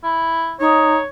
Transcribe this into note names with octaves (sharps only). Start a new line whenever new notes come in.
E4
D#4 C#5